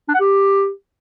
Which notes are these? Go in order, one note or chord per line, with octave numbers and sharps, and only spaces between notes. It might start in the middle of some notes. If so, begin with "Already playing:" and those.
D4
F#5
G4